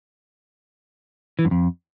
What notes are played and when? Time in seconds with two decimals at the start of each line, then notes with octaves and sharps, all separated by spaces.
1.39 E3
1.45 F#2
1.51 F2